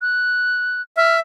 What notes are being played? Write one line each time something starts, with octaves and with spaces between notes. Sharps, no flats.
F#6
E5 F6